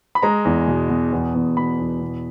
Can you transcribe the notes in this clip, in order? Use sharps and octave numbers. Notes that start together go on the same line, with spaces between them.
B5
G#3 A#5
E2
B2
B2
E2
E2
B2 B5
E2
B2